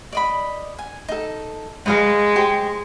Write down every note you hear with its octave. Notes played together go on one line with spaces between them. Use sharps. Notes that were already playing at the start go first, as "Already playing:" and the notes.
D5 D#5 B5
G#5
D#4 A4
G#3 B4 D#5 F5
G4 C5